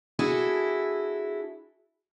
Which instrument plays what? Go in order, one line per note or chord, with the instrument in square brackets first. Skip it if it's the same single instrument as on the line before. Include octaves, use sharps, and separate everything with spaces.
[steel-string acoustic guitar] D4 E4 F#4 G#4 A4